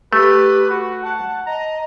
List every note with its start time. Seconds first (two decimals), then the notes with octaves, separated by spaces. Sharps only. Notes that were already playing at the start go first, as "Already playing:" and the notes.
0.13 A3 G4 B4
0.70 F#4
1.03 F#5 A5
1.47 D#5 A#5